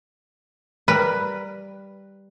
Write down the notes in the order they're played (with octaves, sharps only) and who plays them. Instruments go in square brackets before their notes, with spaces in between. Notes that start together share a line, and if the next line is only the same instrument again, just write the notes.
[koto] G3 A#4 B4